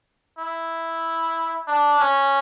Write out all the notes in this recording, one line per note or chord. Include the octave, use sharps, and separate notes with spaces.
E4
D4
C#4